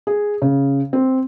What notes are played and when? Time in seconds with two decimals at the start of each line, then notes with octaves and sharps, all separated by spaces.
0.07 G#4
0.42 C#3
0.93 C4